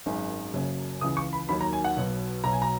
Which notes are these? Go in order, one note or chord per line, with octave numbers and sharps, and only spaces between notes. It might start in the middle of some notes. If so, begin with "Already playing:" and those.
G#1 F#2 D#3 G#3
F#1 F#2 C#3 F#3
C#2 C#3 E3 D#6
C#6
B5
D#2 D#3 F#3 B5
A#5
G#5
F#5
B1 B2 F#3
B1 B2 F#3 A#5
G#5
A#5